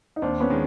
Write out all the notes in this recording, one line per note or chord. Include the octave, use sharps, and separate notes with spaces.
D#4
D#2 C4 D4
B3 C#4
D#3 G#3